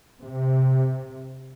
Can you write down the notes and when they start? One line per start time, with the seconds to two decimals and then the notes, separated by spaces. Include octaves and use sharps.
0.24 C3